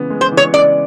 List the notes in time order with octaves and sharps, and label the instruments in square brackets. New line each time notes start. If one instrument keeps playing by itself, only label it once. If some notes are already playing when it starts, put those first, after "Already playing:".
Already playing: [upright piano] C#3 E3 G#3 B3
G#3
[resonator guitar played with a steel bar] C5
[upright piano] E3
[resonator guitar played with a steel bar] C#5
[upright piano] C#3 [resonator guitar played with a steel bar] D5